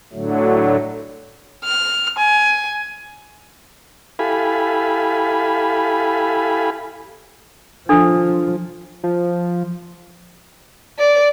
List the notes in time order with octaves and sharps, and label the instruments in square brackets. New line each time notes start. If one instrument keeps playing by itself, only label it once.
[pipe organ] A2 D3 F#3 A3
[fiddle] F6
G#5
[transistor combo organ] E4 G4 A4 F5 G#5 B5
[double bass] F3 [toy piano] D4 A4
[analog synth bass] F3
[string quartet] D5